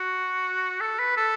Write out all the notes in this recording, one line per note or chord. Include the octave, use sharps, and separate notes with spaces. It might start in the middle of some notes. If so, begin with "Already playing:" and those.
Already playing: F#4
A4
B4
A4